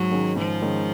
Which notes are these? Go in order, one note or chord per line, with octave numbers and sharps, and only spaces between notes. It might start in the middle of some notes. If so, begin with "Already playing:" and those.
Already playing: G#2 F#3
D#3 G#3 C#4
G#2 F3
D#3 G#3 C#4